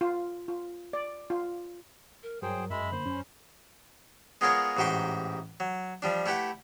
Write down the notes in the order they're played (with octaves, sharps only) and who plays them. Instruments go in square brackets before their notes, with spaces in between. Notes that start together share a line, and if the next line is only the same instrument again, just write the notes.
[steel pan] F4
F4
D5
F4
[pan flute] A#4
[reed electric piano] G2 A#4 [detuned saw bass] F#3 [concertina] G#4 C5 [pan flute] G5
[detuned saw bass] F#2 [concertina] G#3 E5 [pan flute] B5
[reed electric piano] D3 A#3 [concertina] C5
[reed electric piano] F#2 [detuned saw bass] C#4
[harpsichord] G#3 B3 F4 G#4 A#4 C#5
A1 G#2 F#4 G4 C6 D6
F#3
F3 G3 D4
A3 E4 G4 B4 F#5